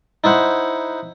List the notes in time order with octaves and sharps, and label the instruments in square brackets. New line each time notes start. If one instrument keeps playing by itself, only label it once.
[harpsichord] D#4 E4 C5 F#5